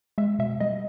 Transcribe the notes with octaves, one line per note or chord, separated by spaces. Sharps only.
G#3 E5
B2 E5
G3 D#5